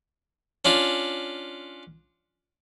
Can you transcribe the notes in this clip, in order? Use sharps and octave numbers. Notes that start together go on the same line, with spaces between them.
C#4 D4 F4